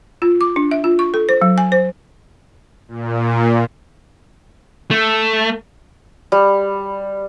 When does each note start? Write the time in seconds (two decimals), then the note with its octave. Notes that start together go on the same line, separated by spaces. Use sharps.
0.22 F4
0.41 D6
0.56 D4
0.71 E5
0.84 F4
0.99 C#6
1.14 A4
1.29 C5
1.42 F#3
1.58 G#5
1.72 C5
2.88 A#2
4.91 A3
6.32 G3